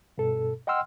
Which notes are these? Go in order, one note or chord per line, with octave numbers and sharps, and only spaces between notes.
G2 B2 A4
D#5 F#5 G5 C6 E6 F6